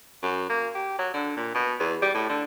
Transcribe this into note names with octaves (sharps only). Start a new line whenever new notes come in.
F#2
A#3
G4
F#3
D3
A#2
B2
E2
G3
A2
D3